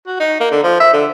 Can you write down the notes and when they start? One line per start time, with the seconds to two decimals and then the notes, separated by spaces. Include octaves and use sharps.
0.07 F#4
0.20 D#4
0.40 A#3
0.51 D3
0.63 F3
0.80 E5
0.93 D3